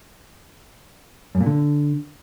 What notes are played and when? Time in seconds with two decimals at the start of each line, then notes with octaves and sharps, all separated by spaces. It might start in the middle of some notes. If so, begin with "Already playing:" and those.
1.35 F#2
1.41 A#2
1.46 D3